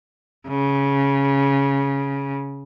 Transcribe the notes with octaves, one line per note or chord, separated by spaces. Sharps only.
C#3